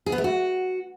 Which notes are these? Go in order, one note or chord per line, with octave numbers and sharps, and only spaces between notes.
G#4
B3
A3
F#4